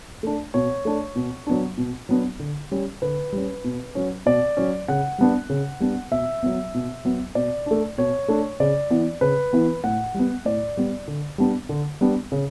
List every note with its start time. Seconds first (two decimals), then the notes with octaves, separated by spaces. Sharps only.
0.23 A3 D4
0.54 B2 C#5
0.85 A3 D4
1.16 B2
1.47 F#3 B3 D4
1.78 B2
2.09 F#3 B3 D4
2.40 D3
2.71 G3 C#4
3.02 D3 B4
3.33 G3 C#4
3.64 B2
3.95 F#3 C#4
4.26 B2 D5
4.57 F#3 C#4
4.88 C#3 F#5
5.18 G3 B3 D4
5.50 C#3
5.80 G3 B3 D4
6.11 B2 E5
6.43 F#3 B3
6.74 B2
7.05 F#3 B3
7.35 B2 D5
7.66 A3 D4
7.98 B2 C#5
8.28 A3 D4
8.60 C#3 D5
8.90 E3 B3
9.21 C#3 B4
9.53 E3 B3
9.84 A2 F#5
10.14 G3 B3
10.45 A2 D5
10.77 G3 B3
11.08 D3
11.38 G3 B3 D4
11.69 D3
12.01 G3 B3 D4
12.32 C#3